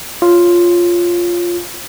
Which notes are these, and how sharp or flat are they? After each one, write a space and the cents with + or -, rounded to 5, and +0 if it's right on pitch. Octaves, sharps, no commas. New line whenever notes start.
F4 +0 C#5 +0